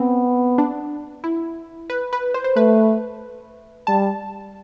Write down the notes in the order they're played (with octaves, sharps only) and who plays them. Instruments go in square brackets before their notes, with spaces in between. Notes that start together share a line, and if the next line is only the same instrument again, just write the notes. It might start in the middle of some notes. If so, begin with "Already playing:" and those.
Already playing: [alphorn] B3 [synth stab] C4
[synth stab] D4
E4
B4
B4
C5
C5
[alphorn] A3 [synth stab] B4
[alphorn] G3 [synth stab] A5